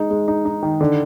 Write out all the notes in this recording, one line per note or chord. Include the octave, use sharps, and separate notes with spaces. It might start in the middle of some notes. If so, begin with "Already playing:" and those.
Already playing: G#3 D#4
G#3
D#4
D#4
D#3
D3